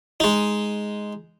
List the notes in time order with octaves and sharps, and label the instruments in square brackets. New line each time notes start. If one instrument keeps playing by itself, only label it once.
[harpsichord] G#3 D#4